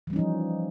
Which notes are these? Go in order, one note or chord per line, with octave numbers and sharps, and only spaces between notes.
E3 F3 G3 C#4 D#4